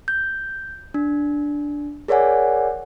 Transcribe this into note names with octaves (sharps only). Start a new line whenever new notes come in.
G6
D4
G#4 A#4 C#5 D5 F#5 G#5